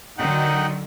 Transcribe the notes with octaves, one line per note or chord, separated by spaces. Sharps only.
D3 D#3 F#3 D#4 F#5 G5